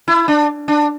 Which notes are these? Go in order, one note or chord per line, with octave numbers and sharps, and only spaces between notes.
E4
D4
D4